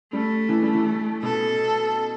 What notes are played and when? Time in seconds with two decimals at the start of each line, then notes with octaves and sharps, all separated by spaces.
0.13 G3 A3
0.49 E3
0.63 G3
0.75 E3
1.22 B2 A4